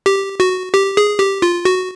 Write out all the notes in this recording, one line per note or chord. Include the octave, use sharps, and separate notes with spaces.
G4
F#4
G4
G#4
G4
F4
F#4